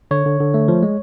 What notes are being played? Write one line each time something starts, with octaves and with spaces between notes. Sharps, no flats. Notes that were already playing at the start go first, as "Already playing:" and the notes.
D3 C#5
D3
D3
A3
F3
G#3